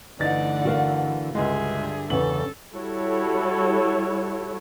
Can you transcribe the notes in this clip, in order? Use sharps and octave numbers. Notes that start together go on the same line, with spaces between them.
G1 D3 E3 A3 D#4 D5 F#5 A6
F#4 A#4 F5
C#2 G2 D3 G#3 G#4 E5
E2 C#3 A4 F#7
G3 E4 F#4 A4 C#5